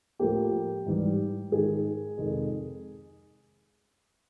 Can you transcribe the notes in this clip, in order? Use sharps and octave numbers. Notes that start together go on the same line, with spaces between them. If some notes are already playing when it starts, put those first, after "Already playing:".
A2 F3 A#3 G4
G#2 E3 G3
G#2 D#3 G#3 G#4
F2 C3 D#3 G#3